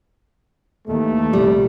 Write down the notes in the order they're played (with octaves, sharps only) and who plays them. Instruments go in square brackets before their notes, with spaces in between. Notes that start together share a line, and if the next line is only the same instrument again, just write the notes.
[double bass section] D#2 E3 [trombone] A3
[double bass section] C2 A#2 [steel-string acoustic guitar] G3